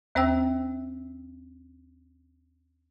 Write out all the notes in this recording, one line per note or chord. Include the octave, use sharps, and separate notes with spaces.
D#2 C4 C5 E5 G5 E6